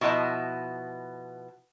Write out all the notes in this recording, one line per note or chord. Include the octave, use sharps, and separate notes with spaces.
B2 F3 E4 F#4 D#5 A5